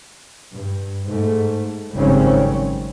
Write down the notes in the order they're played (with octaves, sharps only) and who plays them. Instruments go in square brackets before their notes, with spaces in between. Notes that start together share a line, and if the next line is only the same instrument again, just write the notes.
[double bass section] G2
G#2 A3
G#1 C#3 F#3 G3 C4 C#4